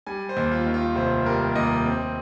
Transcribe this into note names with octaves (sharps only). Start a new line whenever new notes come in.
G3 G#5
C5
D#2
F4
D#3
F4
F1 C5
G3 A#4
D#2 D#5
C4